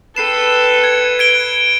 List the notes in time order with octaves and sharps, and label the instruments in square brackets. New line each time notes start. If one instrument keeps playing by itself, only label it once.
[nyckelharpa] A4 G5 [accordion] B4 [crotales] C7 E7
[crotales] G#6 C#7
G#6 D7 G7